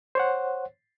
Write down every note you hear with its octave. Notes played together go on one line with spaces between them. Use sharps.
C5 C#5 F#5